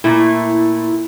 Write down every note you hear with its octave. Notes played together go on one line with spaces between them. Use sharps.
A#2 A3 E4